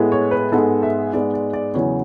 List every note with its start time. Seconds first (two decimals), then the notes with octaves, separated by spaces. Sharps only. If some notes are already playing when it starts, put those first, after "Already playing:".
Already playing: A2 G#3 B3
0.12 C#5
0.31 B4
0.52 G#2 G#3 B3 A4
0.83 E5
1.13 G#2 G#3 B3 D5
1.34 D5
1.53 D5
1.74 E2 C#3 F#3 B3 C#5